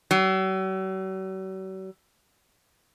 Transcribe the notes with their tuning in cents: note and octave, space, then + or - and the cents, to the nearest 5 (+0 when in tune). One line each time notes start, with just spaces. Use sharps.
F#3 +45